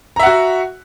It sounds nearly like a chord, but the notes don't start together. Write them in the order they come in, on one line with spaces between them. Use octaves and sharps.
A#5 E5 F#5 F#4